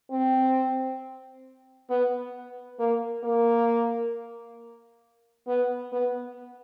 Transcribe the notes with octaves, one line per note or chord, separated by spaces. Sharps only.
C4
B3
A#3
A#3
B3
B3